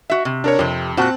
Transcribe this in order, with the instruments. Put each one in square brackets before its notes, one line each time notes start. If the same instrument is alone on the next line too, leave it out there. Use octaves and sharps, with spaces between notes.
[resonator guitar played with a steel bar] F#4 E5
C3
[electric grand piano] D4 A#4 C#5
[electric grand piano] F2 [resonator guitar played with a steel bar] C3 G4
[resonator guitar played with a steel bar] A#2 F#4 [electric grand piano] C4 A5 F#6